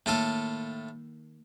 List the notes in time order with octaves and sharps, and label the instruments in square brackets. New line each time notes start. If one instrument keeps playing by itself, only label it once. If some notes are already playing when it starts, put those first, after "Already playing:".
[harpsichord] A2 F4 A4 [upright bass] D#3 A#3